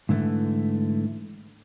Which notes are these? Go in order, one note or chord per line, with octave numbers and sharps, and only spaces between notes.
G#2 D3 E3 G3 A3